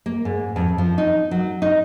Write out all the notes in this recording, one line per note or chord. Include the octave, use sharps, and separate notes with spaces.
A#3
G#2
F2
F3
D#4
F#3
D#4